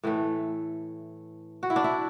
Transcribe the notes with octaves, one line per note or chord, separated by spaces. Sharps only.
A2 E3 A3
F#4
E4
D4
E4